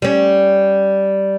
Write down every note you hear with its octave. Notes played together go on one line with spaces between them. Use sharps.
G3 C#4